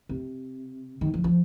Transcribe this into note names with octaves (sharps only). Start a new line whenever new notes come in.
C3
D#3
F3
F3